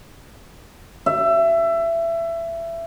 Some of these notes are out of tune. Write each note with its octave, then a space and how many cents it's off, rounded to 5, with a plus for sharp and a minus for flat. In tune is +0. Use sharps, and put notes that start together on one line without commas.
E5 +20